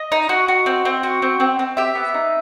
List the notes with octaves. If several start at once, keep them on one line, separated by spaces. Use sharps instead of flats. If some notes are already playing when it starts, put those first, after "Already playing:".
Already playing: D#5
D#4
F#4
F#4
C4
C4
F#4
C4
C4
C4
G4 E5
B3
D#4